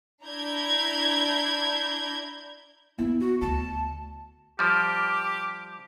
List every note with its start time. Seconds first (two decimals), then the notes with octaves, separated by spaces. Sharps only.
0.24 D4 E4 A#5 G6 G#6
2.98 B3 E4
3.20 F#4
3.41 D2 A5
4.59 F3 G3 G4 D6 F6